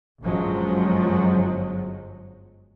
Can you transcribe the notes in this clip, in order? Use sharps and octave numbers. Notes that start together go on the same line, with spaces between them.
G1 F#2 F3 F#3 G#3